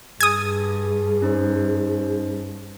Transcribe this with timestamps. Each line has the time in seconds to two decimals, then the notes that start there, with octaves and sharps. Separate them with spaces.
0.20 G2 G#4 G#5 D#6
1.22 C#4 D#4 C5